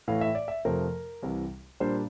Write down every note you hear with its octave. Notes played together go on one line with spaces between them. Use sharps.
A2 E3 A3 F5
E5
D5
E5
F2 C3 F3 A3 A#4
C2 C3 E3
A#2 G3 A#3 D4 C5